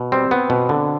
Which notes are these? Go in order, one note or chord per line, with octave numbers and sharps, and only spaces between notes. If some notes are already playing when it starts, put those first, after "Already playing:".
Already playing: B2
G3 C4
B3
B2
D3